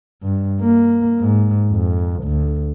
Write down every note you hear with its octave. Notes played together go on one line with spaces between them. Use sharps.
G2
A#3
G#2
F2
D2